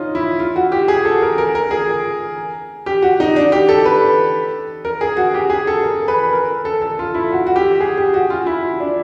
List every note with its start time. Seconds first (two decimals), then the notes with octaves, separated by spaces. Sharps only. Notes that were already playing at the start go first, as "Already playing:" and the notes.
Already playing: C#4 D#4 F4
0.15 E4
0.39 F4
0.56 F#4
0.72 G4
0.88 G#4
1.05 A4
1.22 A#4
1.38 A#4
1.55 A#4
1.71 G#4
2.86 G4
3.02 F#4
3.20 D#4
3.36 D4
3.52 G4
3.69 A4
3.85 B4
4.85 A#4
5.01 G#4
5.17 F#4
5.34 G4
5.50 G#4
5.67 A4
5.83 A#4
6.08 B4
6.33 A#4
6.65 A4
6.82 A4
6.99 F4
7.14 E4
7.32 F#4
7.47 F#4
7.56 G4
7.80 G#4
7.98 G4
8.14 F#4
8.30 F4
8.46 E4
8.80 D4